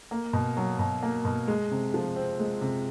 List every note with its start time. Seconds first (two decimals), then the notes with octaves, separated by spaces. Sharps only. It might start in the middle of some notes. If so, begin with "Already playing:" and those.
0.11 A#3
0.33 B2
0.57 F#3
0.79 B2
1.03 A#3
1.25 B2
1.48 G#3
1.71 C3
1.94 F3
2.16 C4
2.39 G#3
2.61 C3